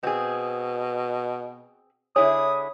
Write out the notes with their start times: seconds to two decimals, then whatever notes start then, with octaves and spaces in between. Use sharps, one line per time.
0.03 B2 C4 G#4
2.16 D3 E4 G#4 C#5 D#6